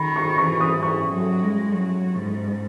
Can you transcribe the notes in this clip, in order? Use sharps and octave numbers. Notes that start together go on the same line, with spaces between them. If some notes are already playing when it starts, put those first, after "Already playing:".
Already playing: D#3 B5
C#6
E3 C#6
D#6
E3 C#6
F#3
G#3
F#3
G#2